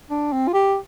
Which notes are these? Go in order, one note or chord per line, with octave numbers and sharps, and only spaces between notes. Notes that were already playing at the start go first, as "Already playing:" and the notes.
D4
C4
F4
G4